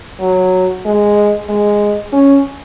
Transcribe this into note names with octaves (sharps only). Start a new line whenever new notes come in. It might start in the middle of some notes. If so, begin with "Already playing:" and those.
F#3
G#3
G#3
C#4